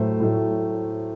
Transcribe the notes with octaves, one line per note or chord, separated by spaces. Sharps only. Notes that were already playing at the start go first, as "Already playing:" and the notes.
Already playing: A2 F#3 A3 C5
A2 F#3 A3